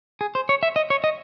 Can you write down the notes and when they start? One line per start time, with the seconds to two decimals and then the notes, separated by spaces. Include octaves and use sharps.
0.21 G#4
0.35 C5
0.49 C#5
0.63 E5
0.76 D#5
0.90 C#5
1.04 D#5